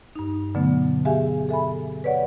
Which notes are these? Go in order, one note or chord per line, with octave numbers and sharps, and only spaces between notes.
G2 D#4
B2 D3 F#3 A3 B3
G4 G#4 E5 F5 G#5
A4 E5 G#5 B5
B4 C#5 D5 F#5